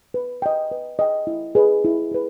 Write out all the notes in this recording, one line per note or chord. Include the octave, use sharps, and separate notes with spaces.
B4
D#5 G5
B4
D#5 G5
E4
G#4 B4 D#5
E4
G#4 B4